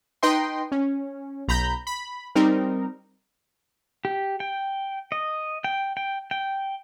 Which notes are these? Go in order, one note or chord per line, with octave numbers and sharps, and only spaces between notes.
D#4 B4 D#5 G5 C6
C#4
B1 A#5 B5 G6
B5
G3 C4 D#4 A#4
G4
G5
D#5
G5
G5
G5